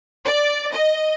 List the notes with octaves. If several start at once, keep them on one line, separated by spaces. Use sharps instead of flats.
D5
D#5